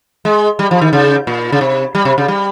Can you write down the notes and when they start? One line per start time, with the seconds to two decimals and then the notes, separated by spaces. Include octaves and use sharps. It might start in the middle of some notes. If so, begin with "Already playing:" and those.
0.25 G#3
0.59 G3
0.71 F3
0.82 D#3
0.93 C#3
1.27 A#2
1.52 C#3
1.61 C3
1.95 G3
2.05 C3
2.18 C#3
2.28 G3